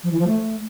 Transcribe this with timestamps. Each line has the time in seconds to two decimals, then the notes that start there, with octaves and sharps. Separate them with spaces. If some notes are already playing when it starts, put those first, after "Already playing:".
0.04 F3
0.11 E3
0.19 F3
0.27 A3